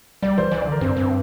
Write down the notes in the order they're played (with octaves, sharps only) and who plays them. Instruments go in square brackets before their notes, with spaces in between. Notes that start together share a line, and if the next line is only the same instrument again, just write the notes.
[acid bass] G3 [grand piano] D5
[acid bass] E3 [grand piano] C5
[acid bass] E3 [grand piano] D5
[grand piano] D5
[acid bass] D3 [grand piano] A#4
[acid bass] G2 [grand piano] C4
[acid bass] G2